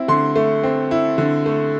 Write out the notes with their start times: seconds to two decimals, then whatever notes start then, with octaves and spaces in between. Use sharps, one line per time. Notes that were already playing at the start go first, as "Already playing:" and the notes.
Already playing: C4 E4
0.08 D3 C6
0.36 A3
0.63 C4
0.91 E4
1.18 D3
1.46 A3